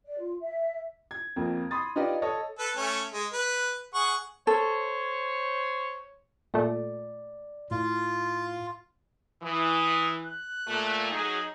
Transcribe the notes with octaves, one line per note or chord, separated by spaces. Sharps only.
D5
F4
E5
G#6
F2 A#3 C4
B5 C6 D#6 A6
D#4 F4 G4 B4 D5 D#5
A4 C#5 D#5
A4 B4
A3 C#4 C#5
G#3
B4
G#4 F#5 C#6
A4 C5 C#5
A#2 A3 D5
A2 F4
E3 D#6
F#6
A#2 A3
F#3 D#4 G#4